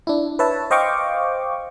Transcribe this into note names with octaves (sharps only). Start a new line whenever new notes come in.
D4 E4
B4 C#5 E5 A5
C5 D#5 F5 G5 C#6 D6